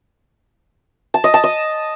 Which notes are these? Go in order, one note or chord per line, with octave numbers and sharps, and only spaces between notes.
A5
D#5
A5
D#5